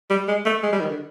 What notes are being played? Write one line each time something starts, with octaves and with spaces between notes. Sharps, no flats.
G3
G#3
A3
G#3
G3
D#3
D3